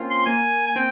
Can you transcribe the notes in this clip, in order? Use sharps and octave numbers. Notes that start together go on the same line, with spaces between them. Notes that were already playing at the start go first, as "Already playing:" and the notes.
Already playing: A#3 C4 C#4 F4
C6
A#3 G#5
G#5
C4 G5